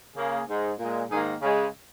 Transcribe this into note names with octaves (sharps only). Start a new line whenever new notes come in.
C#3 A#3 G#4
G#2 G#3
A#2 G#3
G#2 D#3 A#3 G#4
C#3 G#3 C#4